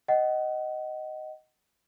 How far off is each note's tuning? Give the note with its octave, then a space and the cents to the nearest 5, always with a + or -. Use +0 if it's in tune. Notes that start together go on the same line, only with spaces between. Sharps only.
D#5 +0 F#5 +30